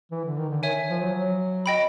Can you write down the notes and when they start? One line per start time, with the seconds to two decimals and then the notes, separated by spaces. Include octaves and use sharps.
0.11 E3
0.25 D3
0.37 D#3
0.50 D3
0.63 D#3 C#5 E5 G#5
0.89 F3
1.01 F#3
1.14 F#3
1.66 D#5 G5 B5